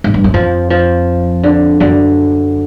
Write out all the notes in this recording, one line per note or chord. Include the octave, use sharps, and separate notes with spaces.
G#2
G2
F#2
F2 F3
F3
D3
F#2 D3